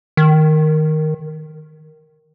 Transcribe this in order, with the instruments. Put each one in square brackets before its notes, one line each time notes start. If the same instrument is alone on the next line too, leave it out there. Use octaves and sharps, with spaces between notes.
[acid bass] D#3